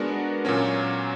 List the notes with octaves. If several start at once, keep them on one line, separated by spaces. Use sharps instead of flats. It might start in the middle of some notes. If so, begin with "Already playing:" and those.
Already playing: G#3 B3 D4 F#4 A#4
A#2 F#3 A#3 C#4